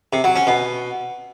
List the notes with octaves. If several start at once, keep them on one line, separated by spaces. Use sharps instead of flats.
C3
F#3
C#4
B2